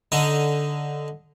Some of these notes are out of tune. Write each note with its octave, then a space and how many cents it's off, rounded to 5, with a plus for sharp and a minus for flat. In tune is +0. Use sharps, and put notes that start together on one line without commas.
D3 -5 D#4 +0